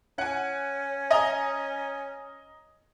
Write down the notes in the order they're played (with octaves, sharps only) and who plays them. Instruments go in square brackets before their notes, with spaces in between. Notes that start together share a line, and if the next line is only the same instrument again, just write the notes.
[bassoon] C#4 [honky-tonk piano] F#5 G#5
[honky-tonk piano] D#5 G#5 A#5